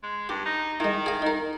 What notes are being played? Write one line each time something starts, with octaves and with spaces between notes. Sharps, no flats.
G#3
G2 G4
D#4
D#3 G#3 E4
G#4 F5
D#4 A#4